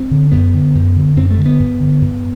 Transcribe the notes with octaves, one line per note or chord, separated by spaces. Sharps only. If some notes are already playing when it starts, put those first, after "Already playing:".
Already playing: C4
D3
F#2 B3
D3
F#2
D3
F#2 C4
A3
D3
B3
G2
D3
G2